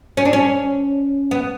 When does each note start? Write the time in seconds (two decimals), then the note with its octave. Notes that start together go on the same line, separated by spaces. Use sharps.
0.17 C#4
0.25 D4
0.33 C#4
1.31 B3